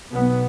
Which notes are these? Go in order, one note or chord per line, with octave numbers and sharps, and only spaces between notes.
B1 B2 B3